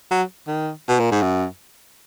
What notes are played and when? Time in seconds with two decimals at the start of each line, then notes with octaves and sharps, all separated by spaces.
0.11 F#3
0.47 D#3
0.89 B2
0.99 A#2
1.12 G#2
1.22 F#2